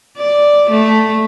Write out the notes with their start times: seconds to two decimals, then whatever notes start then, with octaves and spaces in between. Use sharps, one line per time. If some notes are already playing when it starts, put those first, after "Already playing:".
0.18 D5
0.70 A3